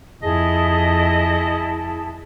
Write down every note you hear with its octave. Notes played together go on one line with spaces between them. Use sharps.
F2 E4 G#4 D#5 A5